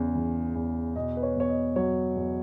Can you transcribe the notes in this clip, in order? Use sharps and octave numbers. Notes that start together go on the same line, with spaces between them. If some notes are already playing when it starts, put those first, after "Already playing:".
Already playing: E2 C#3
E3
E2
B2 D#5
B4
C#5
E2 C#5
D#5
F#3 C#5
E2